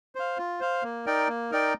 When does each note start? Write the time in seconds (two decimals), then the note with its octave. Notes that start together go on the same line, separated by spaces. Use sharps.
0.15 C5 F5
0.38 F4
0.60 C5 F5
0.83 A#3
1.06 D#4 A#4 D5 G5
1.28 A#3
1.51 D#4 A#4 D5 G5